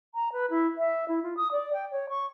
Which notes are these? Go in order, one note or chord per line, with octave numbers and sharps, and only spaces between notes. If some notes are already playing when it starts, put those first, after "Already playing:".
A#5
B4
E4
E5
E4
F4
D#6
D5
G5
C#5
C#6